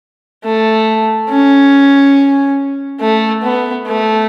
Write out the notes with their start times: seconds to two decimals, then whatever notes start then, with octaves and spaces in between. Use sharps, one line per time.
0.44 A3
1.30 C#4
3.00 A3
3.43 B3
3.87 A3